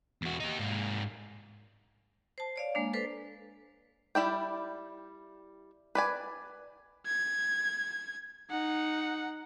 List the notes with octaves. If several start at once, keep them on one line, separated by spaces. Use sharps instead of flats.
E2 F#4
D#4 G4
G#2 A#3
C5 A5
C#5 D5 F5
G#3 A#3 D4
A4 B4 C5
G3 E4 D5 G5
B4 D5 G#5
G#6
D#4 F#5